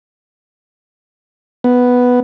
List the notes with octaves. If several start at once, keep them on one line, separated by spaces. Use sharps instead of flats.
B3